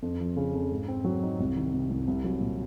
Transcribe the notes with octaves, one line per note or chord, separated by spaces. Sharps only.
F2
F3
C#3
F2
G#2
C4
F#3
D#4
C2
D#3
C3
C2
C2
F#3
A#2